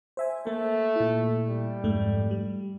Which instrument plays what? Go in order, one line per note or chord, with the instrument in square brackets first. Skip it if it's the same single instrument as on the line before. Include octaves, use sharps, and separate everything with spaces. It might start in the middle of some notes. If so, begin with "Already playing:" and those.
[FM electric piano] C5 E5 G#5
[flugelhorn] A3 [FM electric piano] A#3
[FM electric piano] A#2 E4
[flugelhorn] G3
[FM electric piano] F2 G#2 A3
G3